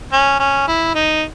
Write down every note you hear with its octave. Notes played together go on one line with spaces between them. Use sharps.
C#4
C#4
E4
D#4